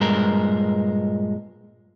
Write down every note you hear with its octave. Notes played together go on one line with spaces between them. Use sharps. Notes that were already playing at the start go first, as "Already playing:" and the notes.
G2 A#2 G#3 A#4